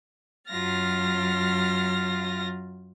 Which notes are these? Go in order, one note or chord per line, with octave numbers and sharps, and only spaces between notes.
F#2 F#3 F4 F6 A6 A#6